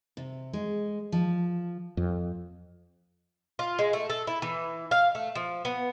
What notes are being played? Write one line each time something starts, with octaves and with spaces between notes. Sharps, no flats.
C3
G#3
F3
F2
F4
G#3
A3
A4
E4
E3
F5
A3
F3
B3